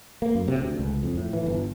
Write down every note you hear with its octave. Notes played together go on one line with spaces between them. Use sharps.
A#3
F#2
C3
D2
C#2
F2
A2
E3
G1